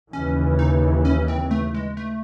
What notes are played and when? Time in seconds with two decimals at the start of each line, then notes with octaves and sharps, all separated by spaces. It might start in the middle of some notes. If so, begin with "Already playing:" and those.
0.13 D#2 C#3 E3 C#4
0.59 D#4
1.05 C#4
1.28 C4
1.51 A3
1.74 G#3
1.97 A3